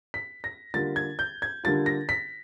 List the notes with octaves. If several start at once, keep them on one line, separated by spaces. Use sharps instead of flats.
B6
A#6
D3 G3 A#3 D4 F4 A6
G#6
G6
G#6
D3 G3 A#3 D4 F4 A6
A#6
B6